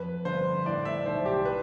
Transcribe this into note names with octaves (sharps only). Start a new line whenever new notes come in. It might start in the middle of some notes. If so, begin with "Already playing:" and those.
Already playing: F2 B4
G1 C5
A2 D5
E5
B1 C5
G4
B4